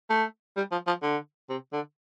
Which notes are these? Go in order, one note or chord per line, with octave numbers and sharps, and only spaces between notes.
A3
G3
F3
F3
D3
C3
D3